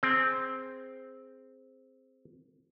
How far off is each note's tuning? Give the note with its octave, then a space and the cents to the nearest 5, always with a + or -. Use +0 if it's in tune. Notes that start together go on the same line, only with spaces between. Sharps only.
C4 +0 G#4 +5